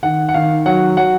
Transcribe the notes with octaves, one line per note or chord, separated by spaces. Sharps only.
D#3 F#5
F#5
D#3 F5
F#3 F#5
F#3 F#5